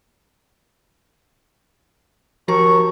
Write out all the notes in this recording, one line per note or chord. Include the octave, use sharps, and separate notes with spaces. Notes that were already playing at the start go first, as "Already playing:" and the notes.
D#2 F3 F#4 A#5 C#6